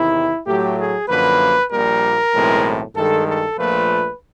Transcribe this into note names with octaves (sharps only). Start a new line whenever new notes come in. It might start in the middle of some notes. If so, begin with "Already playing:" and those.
Already playing: E2 C3 D#3 E4
A2 F#3 A3 G4
G#4
F#2 D3 F3 A#3 B4
A#1 A#2 G3 A#4
B1 A2 E3 G#3 C4
G2 D#3 G#3 A4
A4
A#1 A#2 F3 A3 B4